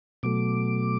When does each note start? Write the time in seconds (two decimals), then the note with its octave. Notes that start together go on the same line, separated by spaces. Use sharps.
0.23 B2 F#3 A3 D6